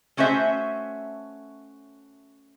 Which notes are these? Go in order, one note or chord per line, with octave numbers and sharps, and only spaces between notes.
A3 C#4 F#4 C5 E5